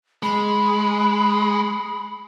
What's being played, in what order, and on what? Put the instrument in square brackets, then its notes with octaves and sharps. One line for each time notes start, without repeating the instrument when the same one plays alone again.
[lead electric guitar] G#3 [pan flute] B5